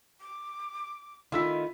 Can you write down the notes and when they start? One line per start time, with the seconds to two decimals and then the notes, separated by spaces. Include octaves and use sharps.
0.21 D6
1.32 D#3 A3 E4 F4 E6 B6